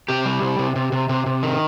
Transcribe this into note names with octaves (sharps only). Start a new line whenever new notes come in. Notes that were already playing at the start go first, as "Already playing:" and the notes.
C3 G4
G3
C3
C3
C3
C3
C3
C3
D#3